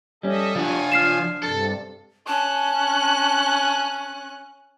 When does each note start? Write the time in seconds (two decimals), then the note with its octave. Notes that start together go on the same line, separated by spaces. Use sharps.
0.23 G3 C#4 A4 D#5 E5
0.56 F3 D4 F4 F#5 G#5
0.92 F6 C7 E7
1.43 G2 C3 A4
2.27 C#4 A5 F#6